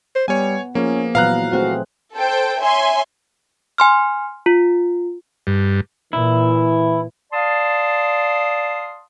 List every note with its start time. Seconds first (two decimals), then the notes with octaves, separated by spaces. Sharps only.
0.16 C5
0.28 G3 B3 C#5 G#5
0.75 F3 A#3 C#4 G#4
1.15 A#2 E3 F#3 B3 F5 A#5 F#6
1.52 A3 C4 F#4 G#4
2.14 A4 C5 G5
2.61 C#5 E5 G#5 C6
3.78 G#5 C6 F6
4.46 F4
5.47 G2
6.13 A#2 E3 E4
7.32 D5 F5 A5 C6 D#6